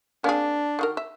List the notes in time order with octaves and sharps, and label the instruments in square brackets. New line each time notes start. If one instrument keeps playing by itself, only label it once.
[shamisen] A#3 C4 G#4 [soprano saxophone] D4
[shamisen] D#3 F#4 A#4
E5